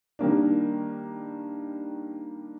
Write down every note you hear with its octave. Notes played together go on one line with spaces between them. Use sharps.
D#3 G3 A#3 D4